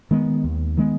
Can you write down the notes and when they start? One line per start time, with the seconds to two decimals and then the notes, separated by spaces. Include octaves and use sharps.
0.11 D#3 G#3 B3
0.44 D#2
0.77 D#3 G#3 B3